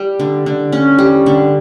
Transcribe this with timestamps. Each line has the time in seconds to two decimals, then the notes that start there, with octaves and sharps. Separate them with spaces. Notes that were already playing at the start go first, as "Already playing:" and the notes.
Already playing: G3
0.20 D3
0.46 D3
0.72 C#4
0.98 G3
1.26 D3